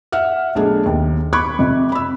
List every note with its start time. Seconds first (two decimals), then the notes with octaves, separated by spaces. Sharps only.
0.12 E5 F#5 F6
0.55 B1 A3 D4 G#4
0.86 D#2
1.33 B5 C#6 D6 F#6 G#6
1.59 F2 C3
1.92 B5 E6